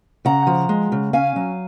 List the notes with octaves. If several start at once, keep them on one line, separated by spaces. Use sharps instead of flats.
C#3 F#5 A#5
F3
G#3
C#3
C#4 F5 G#5
F#3